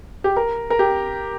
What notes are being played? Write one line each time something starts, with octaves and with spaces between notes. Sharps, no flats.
G4
A#4
A#4
G4